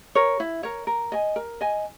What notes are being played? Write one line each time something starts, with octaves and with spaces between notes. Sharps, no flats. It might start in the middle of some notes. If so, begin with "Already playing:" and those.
A#4 C#5
E4
A#4 C#5
A#4
D#5 G#5
A#4
D#5 G#5